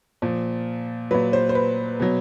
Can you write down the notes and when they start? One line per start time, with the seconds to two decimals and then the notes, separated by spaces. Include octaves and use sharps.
0.22 A#2 F3
1.11 A#2 F#3 B4
1.33 C5
1.49 C5
1.55 B4
2.00 B2 F#3